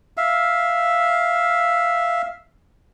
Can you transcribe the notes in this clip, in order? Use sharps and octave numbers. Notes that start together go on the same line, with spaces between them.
E5 F5